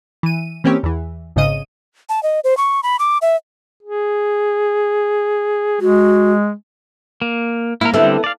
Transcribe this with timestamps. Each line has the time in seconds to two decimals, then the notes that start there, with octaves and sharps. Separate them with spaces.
0.23 E3 D#7
0.64 E3 A#3 C4 C#4 G4 C#5
0.83 E2 E3
1.36 G#1 G#2 C#3 D#5 D#7
2.09 A5
2.23 D#5
2.44 C5
2.57 C#6
2.83 B5
2.99 D6
3.22 E5
3.83 G#4
5.81 G#3 F#4
7.22 A#3
7.81 A#3 E4 A#4
7.94 D3 G3 B3 C4 E4 A4
8.24 D5 F5